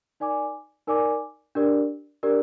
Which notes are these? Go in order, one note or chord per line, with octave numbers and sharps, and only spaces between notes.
D#4 A#4 D5 G#5 D6
D#4 A#4 D5 G#5 D6
D4 G4 A#4 D5
D4 G4 A#4 D5